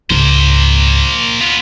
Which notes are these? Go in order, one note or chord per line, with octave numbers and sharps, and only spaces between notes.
C#2 G#2 A#3 C5
B3 F4